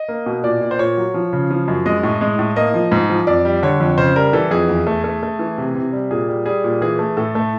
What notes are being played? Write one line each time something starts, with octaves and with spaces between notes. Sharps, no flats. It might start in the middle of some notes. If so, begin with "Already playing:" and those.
Already playing: D#5
A#3
B2
A#2 D5
A#2
C5
A#2 C#5
F#3
F3
C#3
F3
F#2
G#3 D#5
A2
G#3
A2
A#3 D#5
F3
G#2
F3
F2 D5
G3
D3 C#5
F2
C#3 C5
G3 A#4
E3 A4
F2 G#4
E2
A3
A3
A3
E3
C3
C3
G3
A#2 G#4
G3
G3 G#4
A#2
E3 G#4
A3
A2 A4
A3